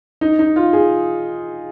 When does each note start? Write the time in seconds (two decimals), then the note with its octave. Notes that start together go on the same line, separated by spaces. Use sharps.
0.21 D#4
0.39 D#4
0.56 F4
0.73 G#4